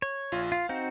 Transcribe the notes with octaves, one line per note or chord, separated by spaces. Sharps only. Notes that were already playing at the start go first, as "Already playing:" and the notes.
C#5
A#1 F4
F4 F5
C4 D#4 F#4